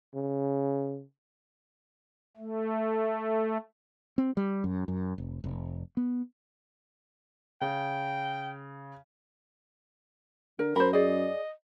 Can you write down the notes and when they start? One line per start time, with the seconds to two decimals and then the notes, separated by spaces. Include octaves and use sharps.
0.15 C#3
2.37 A3
4.18 C4
4.37 G3
4.64 F#2
4.88 F#2
5.18 F1
5.44 F1
5.97 B3
7.61 C#3 G5
10.59 D3 A#4
10.76 F#2 A#4 C5 B5
10.93 G#4 D5 D#5